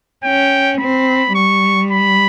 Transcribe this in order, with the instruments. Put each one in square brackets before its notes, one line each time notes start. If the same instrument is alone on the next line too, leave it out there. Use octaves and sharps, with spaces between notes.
[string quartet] C#4 [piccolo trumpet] G5
[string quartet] C4 [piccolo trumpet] B5
[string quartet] G3 [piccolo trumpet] C#6
[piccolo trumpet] B5